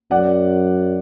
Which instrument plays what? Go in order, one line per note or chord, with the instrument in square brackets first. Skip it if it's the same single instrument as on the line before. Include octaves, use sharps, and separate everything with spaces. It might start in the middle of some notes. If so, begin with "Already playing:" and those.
[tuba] F#2 [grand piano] D5 F#5